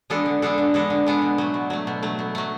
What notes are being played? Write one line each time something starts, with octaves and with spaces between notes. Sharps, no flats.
G#3 B3 D4 A4
D3
G#3 B3 D4 A4
D3
G#3 B3 D4 A4
D3
G#3 B3 D4 A4
B2
F#3 A3
B2
F#3 A3
B2
F#3 A3
B2
F#3 A3